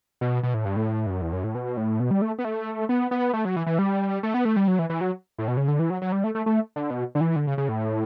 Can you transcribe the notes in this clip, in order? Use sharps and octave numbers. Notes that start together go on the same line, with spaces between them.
B2
B2
A2
G2
A2
G2
F#2
E2
F#2
A2
B2
A2
B2
G3
A3
B3
A3
B3
B3
A3
F#3
E3
E3
G3
A3
B3
A3
G3
F#3
E3
E3
F#3
A2
B2
C#3
D3
E3
F#3
F#3
G3
A3
A3
A3
D3
B2
D3
E3
D3
C#3
C#3
A2